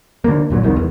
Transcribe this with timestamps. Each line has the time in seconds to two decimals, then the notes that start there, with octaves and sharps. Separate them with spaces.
0.24 D3 A#3
0.50 G1 A#2 F#3
0.62 F1 C2 B2 D#3
0.76 E2